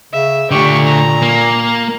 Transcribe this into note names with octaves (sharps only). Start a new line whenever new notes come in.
C#3 E5
A#2 D3 A3 G4 C#6
A#5
A#3